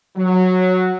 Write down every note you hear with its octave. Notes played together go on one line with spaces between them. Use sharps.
F#3